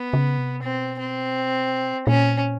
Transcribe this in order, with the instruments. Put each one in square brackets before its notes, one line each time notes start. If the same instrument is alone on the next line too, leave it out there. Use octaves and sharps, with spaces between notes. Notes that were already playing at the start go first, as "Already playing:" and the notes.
Already playing: [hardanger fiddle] B3
[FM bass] C#3
C3
[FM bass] B2 [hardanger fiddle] C4
[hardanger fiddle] C4
[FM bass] A#2 [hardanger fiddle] C#4